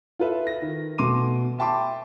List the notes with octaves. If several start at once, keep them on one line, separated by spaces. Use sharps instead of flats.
F4 A4 B4 E5
A#6
D#3
B2 A3 C6 D6 D#7
E5 G5 A5 B5 C6 D6